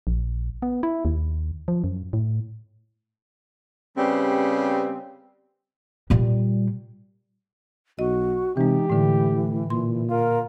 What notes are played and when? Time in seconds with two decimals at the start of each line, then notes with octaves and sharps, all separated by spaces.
0.07 A#1
0.62 B3
0.83 E4
1.05 D#2
1.68 F3
1.84 F#2
2.13 A2
3.97 C#3 G3 B3 C4 G4
6.10 A#2 G3
7.99 B1 F#4 D#5
8.57 C3 E3 G#3 D#4 G4
8.90 A2 D3 E3 A3
9.70 A#2 C6
10.10 F4 A#4